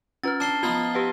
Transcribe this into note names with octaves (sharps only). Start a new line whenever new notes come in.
C#4 F4 B4 F6 A6
D4 A5 C7 G7
F3 B3 D#4 F4
G4 B4 F#5